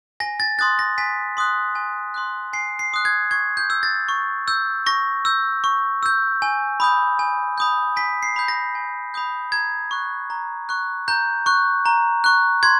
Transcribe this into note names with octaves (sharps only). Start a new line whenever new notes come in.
G#5 A#6
A6
C6 D#6 F#6 A6
A#6
G#5 B6
C6 D#6 F#6
G#5
C6 D#6 F#6
G#5 C7
C7
C6 D#6 F#6
G#6
C#6 G#6
G6
E6 G6
A6
C#6
E6 G6
C#6 A#6
E6 G6
C#6
E6 G6
G#5
B5 D#6 G6
G#5
B5 D#6 G6
G#5 B6
C7
B5 D#6 G6
A#6
G#5
B5 D#6 G6
A#5 G#6
C#6 F#6
A#5
C#6 F#6
A#5 G6
C#6 F#6
A#5
C#6 F#6
C6 G#6